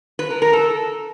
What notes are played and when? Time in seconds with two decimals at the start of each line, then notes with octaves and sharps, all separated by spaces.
0.19 B4
0.30 A#4
0.42 A#4
0.53 A4